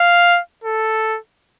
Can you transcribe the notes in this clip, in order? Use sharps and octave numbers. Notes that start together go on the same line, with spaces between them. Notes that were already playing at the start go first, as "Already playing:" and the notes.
Already playing: F5
A4